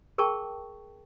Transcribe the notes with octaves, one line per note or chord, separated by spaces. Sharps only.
G#4 A#4 G5 A5 C#6